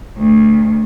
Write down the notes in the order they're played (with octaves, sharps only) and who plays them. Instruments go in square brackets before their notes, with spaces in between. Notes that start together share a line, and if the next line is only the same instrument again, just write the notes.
[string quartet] D2